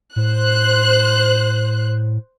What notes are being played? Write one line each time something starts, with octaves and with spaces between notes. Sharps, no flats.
A2 C5 F#6